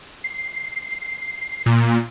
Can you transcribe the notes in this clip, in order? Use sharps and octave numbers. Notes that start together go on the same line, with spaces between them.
C7
A#2